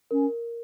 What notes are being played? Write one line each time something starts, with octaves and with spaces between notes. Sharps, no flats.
C#4 A#4